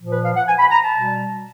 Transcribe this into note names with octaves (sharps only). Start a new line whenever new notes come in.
A#2 F3
B4
F5
F#5
G#5
B5
A#5
A5
B2 G3